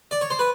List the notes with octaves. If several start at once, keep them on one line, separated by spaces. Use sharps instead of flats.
D5
C#5
C5
B4